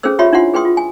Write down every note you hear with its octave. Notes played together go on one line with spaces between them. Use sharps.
C#4 G#4 A4 B4 C5 E6
F4 G4 C#5 E5 B5 C6
D4 E4 F4 F#5 C6
G#4 B4 G5 C6 D#6
F4
G#5